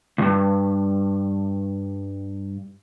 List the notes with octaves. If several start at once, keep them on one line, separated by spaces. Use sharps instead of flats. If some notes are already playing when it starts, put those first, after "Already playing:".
C#2 G2